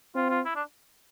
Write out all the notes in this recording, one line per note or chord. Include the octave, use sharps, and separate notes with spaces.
C4 F4
F4
E4
D4